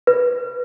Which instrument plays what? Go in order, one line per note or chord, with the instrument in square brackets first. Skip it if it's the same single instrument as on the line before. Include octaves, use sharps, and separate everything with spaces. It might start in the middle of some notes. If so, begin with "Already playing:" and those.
[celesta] B4